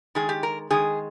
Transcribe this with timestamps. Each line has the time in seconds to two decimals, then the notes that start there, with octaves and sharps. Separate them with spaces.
0.15 D#3 G#3 G#4
0.29 G4
0.43 A#4
0.71 D#3 G#3 G#4